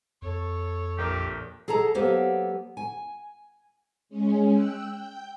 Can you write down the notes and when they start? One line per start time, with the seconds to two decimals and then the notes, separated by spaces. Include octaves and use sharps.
0.22 F2 A4 C#5
0.98 A#1 G4 A#4
1.68 G#4 A4 D#5 A5 A#5
1.95 F#3 A#3 B3 G4 A4 C5
2.77 G#5
4.09 G#3 C#4
4.50 G5 E6 F#6
4.91 G5 G6